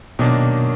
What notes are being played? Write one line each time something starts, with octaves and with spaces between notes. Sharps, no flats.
B2 D#3 F#3 A#3 D4